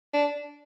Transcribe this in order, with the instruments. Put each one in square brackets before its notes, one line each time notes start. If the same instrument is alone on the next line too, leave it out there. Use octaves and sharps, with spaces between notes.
[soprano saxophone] D4